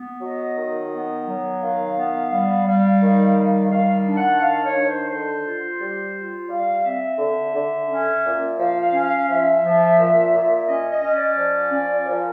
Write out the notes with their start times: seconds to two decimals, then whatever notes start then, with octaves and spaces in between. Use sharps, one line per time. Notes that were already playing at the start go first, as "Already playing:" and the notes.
Already playing: B3
0.21 F#3 D#5
0.56 D#3
0.92 B3
1.26 F#3
1.61 D#3 F5
1.97 B3
2.31 G3
2.66 G3
3.01 D#3
3.36 G3
3.70 D#3 F5
4.05 D4
4.17 F#5
4.40 D#3 F5
4.63 C#5
4.75 D4
4.87 C5
5.10 D3 C5
5.45 F4
5.80 G3
6.15 F4
6.49 G3 F5
6.84 C4 E5
7.19 D3
7.54 D3
7.89 C#4
8.24 A#2
8.59 F3 F5
8.82 F5
8.94 C#4
9.05 F5
9.28 F3 E5
9.63 F3
9.98 A#2
10.33 A#2
10.68 C#4 D#5
10.91 D#5
11.03 C#4
11.15 D5
11.37 F3
11.73 C#4
12.08 F3 A#4